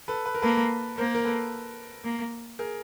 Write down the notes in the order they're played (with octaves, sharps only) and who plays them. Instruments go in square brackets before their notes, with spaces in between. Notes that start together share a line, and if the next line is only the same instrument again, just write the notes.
[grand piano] A4 B4
B4
A#4
[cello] A#3 [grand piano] A4 B4
[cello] A#3 [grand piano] A#4 C5
[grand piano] A#4
A4 B4
[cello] A#3
[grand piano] G#4 A#4